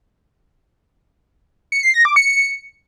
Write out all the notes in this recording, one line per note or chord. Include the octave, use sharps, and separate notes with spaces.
C#7
C7
A#6
D6
C#7